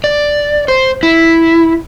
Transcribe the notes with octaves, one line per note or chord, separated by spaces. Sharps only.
D5
C5
E4